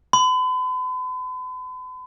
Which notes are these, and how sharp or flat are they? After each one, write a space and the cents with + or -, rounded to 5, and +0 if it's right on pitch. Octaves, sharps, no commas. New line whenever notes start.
B5 +45